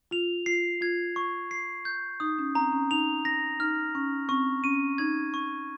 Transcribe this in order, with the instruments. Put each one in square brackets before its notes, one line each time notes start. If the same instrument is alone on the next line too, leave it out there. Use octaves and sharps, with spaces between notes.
[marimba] F4 [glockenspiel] F7
[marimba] F4 [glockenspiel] C7
[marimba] F4 [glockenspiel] G#6
[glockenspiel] C#6
C7
G6
[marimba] D#4 [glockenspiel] D#6
[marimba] C#4
[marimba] C4 [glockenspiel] A#5
[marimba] C#4
[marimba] D#4 [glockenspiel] F7
[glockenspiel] A#6
[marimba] D#4 [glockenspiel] F6
[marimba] C#4 [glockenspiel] C#6
[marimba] C4 [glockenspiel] C#6
[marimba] C#4 [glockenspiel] D#7
[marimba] D#4 [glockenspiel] G#6
[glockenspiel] C#6